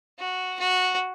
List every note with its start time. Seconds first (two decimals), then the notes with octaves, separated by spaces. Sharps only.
0.19 F#4
0.59 F#4